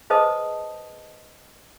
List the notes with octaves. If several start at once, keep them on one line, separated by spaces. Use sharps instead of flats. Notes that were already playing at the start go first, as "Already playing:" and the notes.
G#4 B4 C5 D#5 A5 D#6